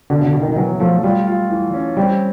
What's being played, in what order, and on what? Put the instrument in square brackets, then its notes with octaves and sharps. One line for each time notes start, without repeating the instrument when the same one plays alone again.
[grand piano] B2 [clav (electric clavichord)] D3
[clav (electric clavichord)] D3
[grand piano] B2
[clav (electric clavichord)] D#3
D#3
[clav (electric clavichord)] E3 [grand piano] F#3
[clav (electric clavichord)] F3 [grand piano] A3
[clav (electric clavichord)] G3 [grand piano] F4
[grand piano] F4
E3
C#4
[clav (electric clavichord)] G3 [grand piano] C4